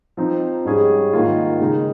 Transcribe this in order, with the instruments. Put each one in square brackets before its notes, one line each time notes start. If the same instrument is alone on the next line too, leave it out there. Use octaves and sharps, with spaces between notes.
[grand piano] F3 C4 D#4
G#2 G3 C#4 G#4
G#2 D#3 A#3 F4
C#3 G#3 D#4